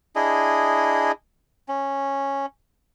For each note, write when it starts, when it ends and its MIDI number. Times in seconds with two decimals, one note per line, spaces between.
0.16 1.12 62
0.16 1.12 64
0.16 1.12 68
0.16 1.12 75
1.68 2.46 61